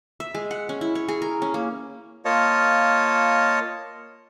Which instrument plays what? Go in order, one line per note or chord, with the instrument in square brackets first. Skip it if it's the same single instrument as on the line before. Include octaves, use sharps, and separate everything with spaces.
[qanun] E5
G#3
F#5
C#4
E4
C#5
G#4
A#4
C#4
A#3
[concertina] A#3 F4 C#5 D#5 A5